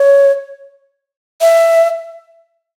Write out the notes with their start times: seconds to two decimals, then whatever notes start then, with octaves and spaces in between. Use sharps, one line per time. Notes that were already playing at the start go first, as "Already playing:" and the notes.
Already playing: C#5
1.41 E5